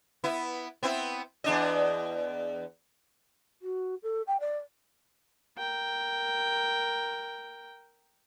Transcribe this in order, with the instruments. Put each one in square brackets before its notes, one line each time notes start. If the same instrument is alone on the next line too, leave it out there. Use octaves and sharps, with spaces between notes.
[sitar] B3 E4
B3 C4 E4
E2 D4 D#5
[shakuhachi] F#4
A4
G5
D5
[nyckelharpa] A#4 G5